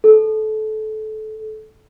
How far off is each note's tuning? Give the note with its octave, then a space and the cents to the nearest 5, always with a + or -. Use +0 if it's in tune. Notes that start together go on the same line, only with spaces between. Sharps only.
A4 -25